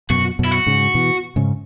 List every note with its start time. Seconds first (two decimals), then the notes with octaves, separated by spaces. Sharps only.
0.10 F#2 B2 F#4
0.39 F#2 B2
0.45 E4
0.52 F#4
0.66 G#2 C#3
0.95 B2 E3
1.36 G#2 C#3